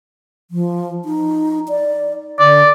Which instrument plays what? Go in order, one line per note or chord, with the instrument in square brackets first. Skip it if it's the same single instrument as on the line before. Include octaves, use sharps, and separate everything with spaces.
[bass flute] F3
D#4
D5
[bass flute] D3 [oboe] D5